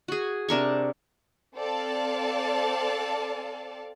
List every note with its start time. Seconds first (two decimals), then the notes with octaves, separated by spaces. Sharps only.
0.08 F#4 G#4
0.49 C3 D4 A#4 C#6
1.56 C4 A4 D5 F5 A5